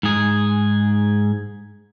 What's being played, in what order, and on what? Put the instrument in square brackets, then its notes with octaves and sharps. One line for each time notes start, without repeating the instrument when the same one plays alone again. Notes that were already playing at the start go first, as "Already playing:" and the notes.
[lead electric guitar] G#2 G#4